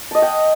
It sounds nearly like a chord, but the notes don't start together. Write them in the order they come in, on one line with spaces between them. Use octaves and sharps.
A5 D#5 F#5 G5